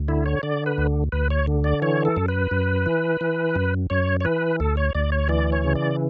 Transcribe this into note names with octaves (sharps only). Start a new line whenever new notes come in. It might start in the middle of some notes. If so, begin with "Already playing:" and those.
Already playing: D2
D3 E4
C#5
D3 D5
B4
D2
D2 B4
C#5
D3
D5
E3 C#5
A4
F#2
B4
F#2
E3
E3
F#2
F#2 C#5
C#5
E3 B4
D2 A4
C#5
D2 D5
C#5
E3 D5
C#5
C#3
D5